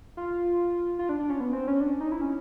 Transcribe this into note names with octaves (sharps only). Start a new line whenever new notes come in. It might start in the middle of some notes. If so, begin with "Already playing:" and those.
F4
F4
D4
D4
C#4
B3
C4
C#4
D4
D#4
E4
C#4